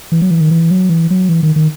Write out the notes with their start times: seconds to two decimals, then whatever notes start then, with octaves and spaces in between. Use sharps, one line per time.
0.12 E3
0.22 F#3
0.31 E3
0.41 D#3
0.51 E3
0.71 F#3
0.89 E3
1.10 F#3
1.29 E3
1.43 D#3
1.56 D#3